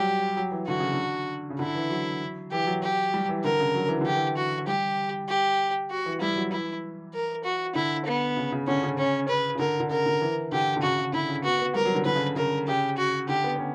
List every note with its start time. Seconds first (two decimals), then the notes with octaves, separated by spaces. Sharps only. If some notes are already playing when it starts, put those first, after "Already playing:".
Already playing: F#3 G3 G4
0.37 F#3
0.52 E3
0.67 D3 F#4
0.80 C#3
0.93 D3
1.50 C#3
1.59 D3 E4
1.75 E3
1.90 F#3
2.52 E3 G4
2.67 F#3
2.83 G4
3.14 G3
3.29 E3
3.44 D3 A#4
3.60 C#3
3.75 F#3
3.88 E3
4.01 D3 G4
4.14 E3
4.37 F#4
4.67 G3 G4
5.29 G4
5.91 F#4
6.06 E3
6.21 G3 E4
6.36 F#3
6.52 E3 E4
7.14 A#4
7.44 F#4
7.75 D3 E4
8.06 B3
8.37 C#3
8.52 C#3
8.67 D3 C#4
8.83 C#3
8.98 C#4
9.28 B4
9.55 C#3
9.59 D3 A#4
9.80 D3
9.90 C#3 A#4
10.06 D3
10.21 E3
10.52 D3 G4
10.77 D3
10.82 C#3 F#4
10.98 C#3
11.13 D3 E4
11.29 C#3
11.44 B3 F#4
11.59 B3
11.75 G3 A#4
11.85 F#3
11.95 D3
12.05 D3 B4
12.16 C#3
12.36 C#3 A#4
12.68 C#3 G4
12.97 F#4
13.29 D3 G4
13.44 B3
13.56 B3
13.59 C#4